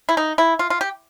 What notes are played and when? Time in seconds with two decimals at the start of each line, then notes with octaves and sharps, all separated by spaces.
0.09 E4
0.17 D#4
0.38 E4
0.59 F4
0.70 F4
0.81 G4